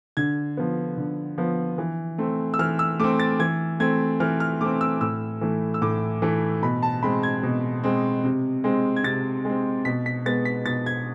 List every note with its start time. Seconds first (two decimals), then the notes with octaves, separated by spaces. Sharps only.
0.17 D3 G#6
0.57 F3 B3
0.97 D3
1.38 F3 B3
1.78 E3
2.18 A3 C4
2.54 E6
2.59 E3 F6
2.79 E6
2.99 A3 C4 D6
3.20 A6
3.39 E3 G#6
3.80 A3 C4 G#6
4.20 E3 F6
4.40 F6
4.61 A3 C4 D6
4.81 E6
5.01 A2 E6
5.41 E3 A3
5.74 E6
5.82 A2 D6
6.22 E3 A3
6.62 B2 B5
6.83 A5
7.03 G#3 C4 B5
7.23 G#6
7.43 B2
7.84 G#3 C4
8.24 C3
8.64 G#3 C4
8.96 G#6
9.04 C3 A6
9.45 G#3 C4
9.85 B2 B6
10.06 B6
10.26 G#3 B3 A6
10.45 B6
10.66 B2 A6
10.86 G#6